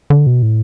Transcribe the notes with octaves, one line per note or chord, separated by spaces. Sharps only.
D3
B2
A2